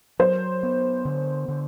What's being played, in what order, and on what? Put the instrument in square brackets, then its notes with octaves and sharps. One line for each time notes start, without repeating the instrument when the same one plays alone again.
[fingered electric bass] F#3 [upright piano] C5
[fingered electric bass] B3
D3
D3